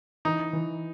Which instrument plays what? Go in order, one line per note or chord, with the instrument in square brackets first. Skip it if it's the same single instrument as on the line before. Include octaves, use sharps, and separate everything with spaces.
[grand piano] E3 [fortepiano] D#4
[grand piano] E3